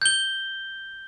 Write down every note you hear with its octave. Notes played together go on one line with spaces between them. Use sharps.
G6 G7